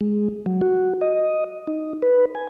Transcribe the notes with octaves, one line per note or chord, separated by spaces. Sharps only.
G#3
F#3
F#4
D#5
D#4
B4
G#5